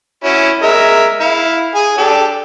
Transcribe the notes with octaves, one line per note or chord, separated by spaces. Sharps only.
C#4 E4 F#4
G#3 A#4 E5
E4 F5
G#4 G#5
D4 G4 A4